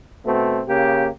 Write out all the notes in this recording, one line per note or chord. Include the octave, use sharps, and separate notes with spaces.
B2 A3 C4
C#3 A#3 G4